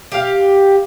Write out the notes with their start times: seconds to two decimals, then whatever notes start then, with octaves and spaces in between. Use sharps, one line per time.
0.12 G4 F5